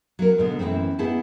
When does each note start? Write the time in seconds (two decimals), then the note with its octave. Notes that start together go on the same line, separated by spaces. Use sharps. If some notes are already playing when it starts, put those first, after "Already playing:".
0.19 F#3 G#4 A#4
0.38 G#2 B2 D3
0.59 F#2 E3 F#3 A3 C4
0.99 G#2 B3 E4 G#4 A5